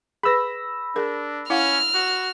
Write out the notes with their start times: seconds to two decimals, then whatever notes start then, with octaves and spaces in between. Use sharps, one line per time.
0.23 G#4 B4 B5 E6 A#6
0.96 D4 G#4 A#4
1.50 C#4 E4 F5 F#5 F6
1.94 F#4